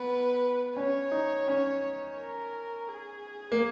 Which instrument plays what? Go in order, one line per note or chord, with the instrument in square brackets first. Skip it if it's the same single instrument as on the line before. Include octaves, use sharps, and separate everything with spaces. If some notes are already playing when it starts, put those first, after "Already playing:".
Already playing: [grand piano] B3 [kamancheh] B4
[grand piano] C#4 [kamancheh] C#5
[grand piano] D#4
C#4
[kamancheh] A#4
G#4
[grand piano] A#3